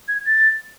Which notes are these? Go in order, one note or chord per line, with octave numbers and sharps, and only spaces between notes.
G#6
A6